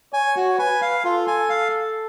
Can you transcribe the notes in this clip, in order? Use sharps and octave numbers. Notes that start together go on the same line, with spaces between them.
C#5 G#5
F#4
B4 G#5
F5
F4 A4
G#5
F5